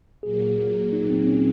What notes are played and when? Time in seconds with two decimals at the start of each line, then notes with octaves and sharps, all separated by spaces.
0.23 A#2 F#3 A#3 G#4
0.92 D#4
1.10 C4
1.27 C#4